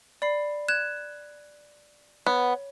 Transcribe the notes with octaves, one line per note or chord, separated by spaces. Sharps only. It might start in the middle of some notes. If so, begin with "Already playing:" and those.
D5 B5 C7
F#6 G#6 E7
B3 C#5